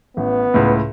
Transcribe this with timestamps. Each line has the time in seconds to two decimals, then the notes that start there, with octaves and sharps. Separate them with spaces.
0.17 A1 B3
0.54 C#2 A2